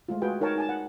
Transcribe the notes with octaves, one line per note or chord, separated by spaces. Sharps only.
G#3 A3 F4
G#3 F4 F#4 G#4 B4 G5
D#4 A#4 C#5 G5 A5
D#4 G#5 A5
F#5